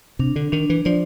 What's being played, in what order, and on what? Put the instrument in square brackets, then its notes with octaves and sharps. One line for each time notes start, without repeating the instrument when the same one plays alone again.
[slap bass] C3 [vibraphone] D4
[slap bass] D3
[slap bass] D#3 [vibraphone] D4
[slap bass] E3
[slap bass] F3 [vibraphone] D5